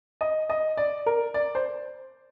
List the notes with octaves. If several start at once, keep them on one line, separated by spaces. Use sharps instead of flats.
D#5
D#5
D5
A#4
D5
C5